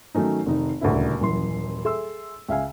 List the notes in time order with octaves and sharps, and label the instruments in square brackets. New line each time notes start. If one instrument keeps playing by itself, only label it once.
[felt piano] D#3 F#3 A3 C#4 D#4
F1 D#3 D#4
D#1 D2 C#3 E4
D#1 F#2 E3 C6
G#4 A4 E5 C6 E6
C#2 E5 F5 G#5